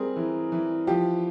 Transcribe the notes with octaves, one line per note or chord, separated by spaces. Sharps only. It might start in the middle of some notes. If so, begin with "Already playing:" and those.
Already playing: G3 C4 G#4 A#4
E3
E3
F3 G4